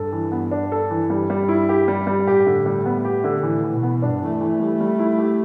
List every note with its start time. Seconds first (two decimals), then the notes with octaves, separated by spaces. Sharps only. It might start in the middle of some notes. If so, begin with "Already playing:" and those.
Already playing: G2 A4
0.12 E3
0.32 B3
0.51 D4
0.72 A4
0.90 E3
1.10 G2 G3
1.30 G3
1.48 E4
1.69 G4
1.88 G3
2.07 G3
2.27 A2 G4
2.47 D3
2.66 G3
2.86 B3
3.05 G4
3.24 D3
3.43 A2 E3
3.63 E3
3.73 B2
3.83 B3
4.02 G2 D4
4.22 E3
4.31 A3
4.41 E3
4.60 G3
4.80 G3
4.99 E4
5.18 G4